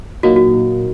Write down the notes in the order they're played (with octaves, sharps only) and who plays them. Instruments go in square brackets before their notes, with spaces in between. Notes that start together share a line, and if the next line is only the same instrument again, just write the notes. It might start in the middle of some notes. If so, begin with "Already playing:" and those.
[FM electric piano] A#2 F#3 A#3 D#4 [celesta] F#4
[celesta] F#4